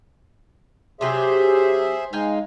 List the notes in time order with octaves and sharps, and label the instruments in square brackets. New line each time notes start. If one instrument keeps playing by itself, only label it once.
[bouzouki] C3 F#3 G4 [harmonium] G#4 C5 E5
[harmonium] G#3 D#4 [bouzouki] F5 G5 G#5